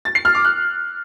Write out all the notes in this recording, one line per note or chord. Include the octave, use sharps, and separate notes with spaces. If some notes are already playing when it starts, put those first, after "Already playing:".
A6
C7
F6
D6
F#6